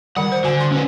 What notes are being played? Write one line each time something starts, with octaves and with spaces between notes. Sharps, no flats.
D#3 G3 F#5
C5
D3 F#4 G#5
C6
C#4 B4